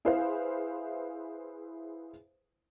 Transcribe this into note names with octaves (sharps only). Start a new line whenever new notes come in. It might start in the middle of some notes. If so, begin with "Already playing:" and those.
E4 G#4 B4 C5 F5